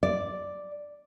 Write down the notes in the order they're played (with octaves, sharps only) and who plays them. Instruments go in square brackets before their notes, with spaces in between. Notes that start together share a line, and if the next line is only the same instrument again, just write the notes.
[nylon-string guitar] D5